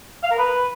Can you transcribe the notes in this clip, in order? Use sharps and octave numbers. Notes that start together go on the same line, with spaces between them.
F5
A#4
B4